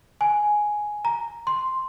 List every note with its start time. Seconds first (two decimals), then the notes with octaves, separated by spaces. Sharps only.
0.21 G#5
1.05 A#5
1.47 C6